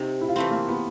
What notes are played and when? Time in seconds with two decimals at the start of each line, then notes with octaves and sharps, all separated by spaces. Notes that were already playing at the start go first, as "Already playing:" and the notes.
Already playing: C3 D#4
0.21 E4
0.28 F4
0.36 E3 A3 C4 E4
0.51 A#3
0.68 B3